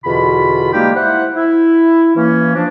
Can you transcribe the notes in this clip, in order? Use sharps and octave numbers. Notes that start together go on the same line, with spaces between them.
E2 B2 D3 F4 B5
G3 G#3 A#3 D#4 F4 G4
E4 C5 F#5
E4
E3 A#3 C#4
F3 D4